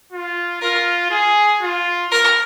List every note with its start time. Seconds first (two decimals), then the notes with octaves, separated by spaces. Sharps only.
0.12 F4
0.61 F4 A#4
1.11 G#4
1.62 F4
2.11 A#4